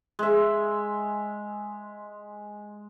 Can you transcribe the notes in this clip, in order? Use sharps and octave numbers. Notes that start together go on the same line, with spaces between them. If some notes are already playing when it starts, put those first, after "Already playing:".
G#3 E5